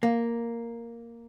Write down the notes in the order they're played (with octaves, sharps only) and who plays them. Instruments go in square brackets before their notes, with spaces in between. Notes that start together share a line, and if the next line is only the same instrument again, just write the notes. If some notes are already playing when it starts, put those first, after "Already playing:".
[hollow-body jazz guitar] A#3